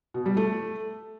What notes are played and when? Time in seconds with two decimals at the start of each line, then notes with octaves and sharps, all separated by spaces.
0.14 B2
0.26 G3
0.37 A3